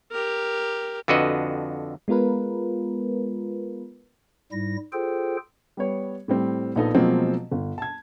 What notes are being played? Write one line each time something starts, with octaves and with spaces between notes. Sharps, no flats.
G4 A#4
F2 D3 F#4 B4 D#5
G#3 B3 F4 A#4 B4
G#2 G3 E4 A#6
F4 G#4 A4 C5 G5
G3 B3 C#5
A2 G3 C4
A#1 B3 D#4 A4 D#5
B2 F3 F#3 G#3 A#3 C4
G1
A5 G#6